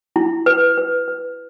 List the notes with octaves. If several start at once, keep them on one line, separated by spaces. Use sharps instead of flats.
E4
B4
B4
B4